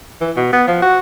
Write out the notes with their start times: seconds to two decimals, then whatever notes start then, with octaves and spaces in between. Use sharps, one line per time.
0.21 E3
0.37 B2
0.53 B3
0.68 F3
0.82 F#4